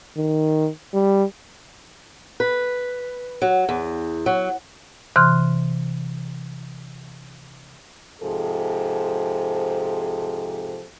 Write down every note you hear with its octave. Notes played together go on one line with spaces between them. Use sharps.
D#3
G3
B4
F#3
E2
F#3
C3 E3 C6 F6 F#6
G#2 C3 F3 G#4 A4